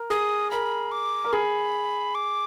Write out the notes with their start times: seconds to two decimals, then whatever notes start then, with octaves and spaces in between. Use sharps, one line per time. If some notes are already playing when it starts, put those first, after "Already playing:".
Already playing: A#4
0.10 G#4 D#6
0.51 A#4 B5
0.92 D6
1.24 A#4
1.33 G#4 B5
2.15 D6